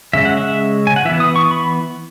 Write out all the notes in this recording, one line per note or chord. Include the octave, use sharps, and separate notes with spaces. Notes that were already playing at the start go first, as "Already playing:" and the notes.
C#3 G#3 C#4 E5
F#5
E5
G#5
F#5
E3 B3 E5
D#6
C#6
B5